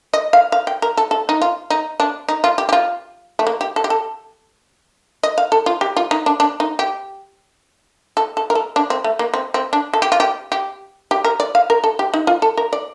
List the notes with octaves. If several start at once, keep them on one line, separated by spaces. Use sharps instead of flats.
D#5
F5
F5
G5
A#4
A4
A4
D#4
F4
D#4
D4
D#4
F4
G4
G4
F4
A3
A#3
G4
A4
G4
A4
D#5
F5
A4
F4
G4
F4
D#4
D4
D4
D#4
G4
A4
A4
A#4
A4
D4
C4
A3
A#3
C4
C4
D4
A4
G4
F4
G4
G4
G4
A#4
D5
F5
A#4
A4
G4
D#4
F4
A4
A#4
D5